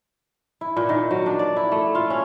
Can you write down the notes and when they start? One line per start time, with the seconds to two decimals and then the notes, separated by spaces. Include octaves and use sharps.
0.61 E4
0.77 A#2
0.89 D#3
1.11 F#3
1.26 D4
1.39 D5
1.57 E4
1.72 A3
1.95 F4
2.10 C#4